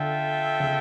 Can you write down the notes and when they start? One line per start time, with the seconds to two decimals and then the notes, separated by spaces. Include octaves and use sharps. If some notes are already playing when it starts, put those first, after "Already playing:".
Already playing: D3 F4 A4 E5 G5
0.60 C#3